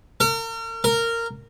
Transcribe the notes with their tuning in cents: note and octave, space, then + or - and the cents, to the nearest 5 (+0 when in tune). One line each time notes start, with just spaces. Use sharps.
A#4 -40
A#4 -15